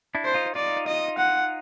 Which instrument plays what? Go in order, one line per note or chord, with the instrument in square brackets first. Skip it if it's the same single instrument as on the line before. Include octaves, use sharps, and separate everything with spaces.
[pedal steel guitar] D4 E4
[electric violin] C5
[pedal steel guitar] D#4 F4
[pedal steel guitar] D#4 F4 [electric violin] D5
[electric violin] D#5
F#5